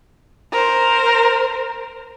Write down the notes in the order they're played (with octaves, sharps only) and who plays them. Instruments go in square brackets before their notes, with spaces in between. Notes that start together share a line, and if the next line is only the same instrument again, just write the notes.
[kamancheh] A#4 C5